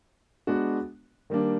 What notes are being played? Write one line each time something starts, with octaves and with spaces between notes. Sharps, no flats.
G#3 B3 D4 F#4
D#3 G3 A#3 D4